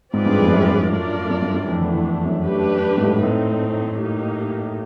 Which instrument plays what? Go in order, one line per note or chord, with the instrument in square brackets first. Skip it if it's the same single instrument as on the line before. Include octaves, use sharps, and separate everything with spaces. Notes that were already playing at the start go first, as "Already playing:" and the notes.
[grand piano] G#2 [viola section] C4 F4 G#4 B4 D5
[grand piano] G2
F2
G2
F#2
F#2
[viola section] A3 D4 F4 A#4 D5
[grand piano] F#2
G2
F#2
[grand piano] F2 [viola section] E3 A3 D4
[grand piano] E2
E2
F#2
[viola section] A3 D4 G4 B4
[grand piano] G#2
A2
[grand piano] A2 [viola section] A3 C4 D#4
[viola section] A#3 D#4 G4